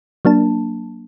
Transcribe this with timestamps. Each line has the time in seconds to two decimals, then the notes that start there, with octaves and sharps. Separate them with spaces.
0.25 F#3 A#3 D4 A5